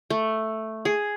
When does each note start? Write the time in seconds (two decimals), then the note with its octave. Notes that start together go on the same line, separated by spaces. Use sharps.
0.10 A3
0.85 G#4